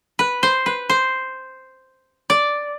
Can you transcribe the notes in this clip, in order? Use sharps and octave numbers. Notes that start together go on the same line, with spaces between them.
B4
C5
B4
C5
D5